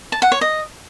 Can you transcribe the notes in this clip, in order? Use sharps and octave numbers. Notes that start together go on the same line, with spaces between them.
A5
F#5
C#5
D#5